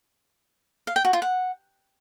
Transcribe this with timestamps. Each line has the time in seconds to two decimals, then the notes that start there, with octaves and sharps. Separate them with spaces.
0.87 F5
0.96 G5
1.05 F#4
1.13 F4
1.22 F#5